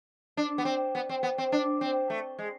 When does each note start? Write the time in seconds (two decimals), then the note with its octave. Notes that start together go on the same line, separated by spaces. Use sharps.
0.37 D4
0.58 B3
0.65 C4
0.95 B3
1.09 C4
1.23 B3
1.38 C4
1.52 D4
1.81 C4
2.10 A3
2.39 G#3